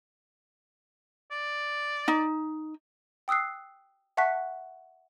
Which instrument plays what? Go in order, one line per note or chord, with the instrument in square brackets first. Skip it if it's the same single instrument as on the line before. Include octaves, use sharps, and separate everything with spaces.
[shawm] D5
[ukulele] D#4
[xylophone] G5 D#6 E6 F#6 C7
E5 F#5 A5 C#6 F#6 B6